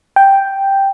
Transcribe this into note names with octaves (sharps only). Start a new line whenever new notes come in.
G5